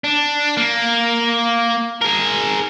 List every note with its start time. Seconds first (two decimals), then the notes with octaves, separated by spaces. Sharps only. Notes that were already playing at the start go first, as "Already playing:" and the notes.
0.04 D4
0.57 A#3
2.01 G#4 A#4